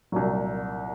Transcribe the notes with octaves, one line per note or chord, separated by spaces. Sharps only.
C2 A#2 F#3